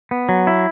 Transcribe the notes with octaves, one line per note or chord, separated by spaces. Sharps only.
B3
F#3
E4